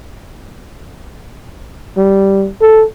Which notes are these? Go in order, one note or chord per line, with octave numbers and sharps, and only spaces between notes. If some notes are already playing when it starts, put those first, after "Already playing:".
G3
A4